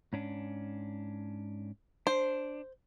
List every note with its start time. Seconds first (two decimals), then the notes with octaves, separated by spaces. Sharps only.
0.13 G#2 C#4 D4
2.07 D4 C5